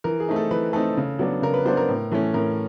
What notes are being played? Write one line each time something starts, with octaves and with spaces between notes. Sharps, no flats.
E3 A#4
G#4
A3 C4 D#4
A4
E3 B4
A3 C4 D#4 A4
C#3
F#3 B3 D4
C#3 A#4
B4
F#3 B3 D4 C5
A#4
A2
E3 A3 C#4
A2 A#4